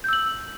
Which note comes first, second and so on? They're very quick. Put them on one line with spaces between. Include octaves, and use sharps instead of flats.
G6 E6 F#7